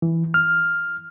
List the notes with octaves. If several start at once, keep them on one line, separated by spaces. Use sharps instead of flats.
E3
F6